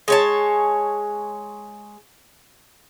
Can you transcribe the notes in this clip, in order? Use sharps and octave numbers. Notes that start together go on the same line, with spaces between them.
G#3 C#5 A5